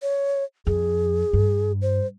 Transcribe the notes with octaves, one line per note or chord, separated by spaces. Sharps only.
C#5
F2 G#4
G2
C5